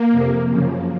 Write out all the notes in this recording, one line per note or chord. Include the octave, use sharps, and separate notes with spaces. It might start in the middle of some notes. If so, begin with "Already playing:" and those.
Already playing: A#3
F2 C3 F3
F#2 C#3 F3